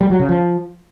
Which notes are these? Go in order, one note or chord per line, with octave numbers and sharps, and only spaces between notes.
G3
F#3
C#3
F3